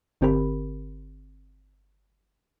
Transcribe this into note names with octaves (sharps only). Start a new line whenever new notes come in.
G1 D3 C4 G4 A#4 B5